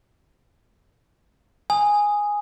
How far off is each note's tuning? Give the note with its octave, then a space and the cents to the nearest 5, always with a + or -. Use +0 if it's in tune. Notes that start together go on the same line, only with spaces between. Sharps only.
G#5 -5 D#6 +0